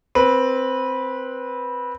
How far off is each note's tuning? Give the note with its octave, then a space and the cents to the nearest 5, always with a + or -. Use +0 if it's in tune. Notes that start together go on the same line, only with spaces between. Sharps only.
C4 +0 B4 -15